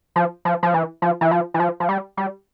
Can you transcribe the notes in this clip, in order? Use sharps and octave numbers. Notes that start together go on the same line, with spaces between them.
F3
F3
F3
E3
F3
E3
F3
E3
F3
F3
G3
G3